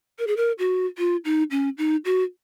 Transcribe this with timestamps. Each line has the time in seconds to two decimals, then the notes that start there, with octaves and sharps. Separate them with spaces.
0.19 A#4
0.27 G#4
0.37 A#4
0.59 F#4
0.98 F4
1.25 D#4
1.51 C#4
1.78 D#4
2.05 F#4